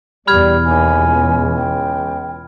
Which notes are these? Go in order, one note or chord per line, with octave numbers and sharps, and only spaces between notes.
E2 B2 G3 D5 B5 F6 G#6
D#2 G#5
C#2
G5